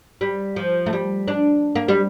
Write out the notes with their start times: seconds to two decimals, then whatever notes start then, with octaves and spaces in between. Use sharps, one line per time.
0.21 G3
0.56 F3
0.86 A3
0.93 G3
1.28 D4
1.76 A#3
1.88 G3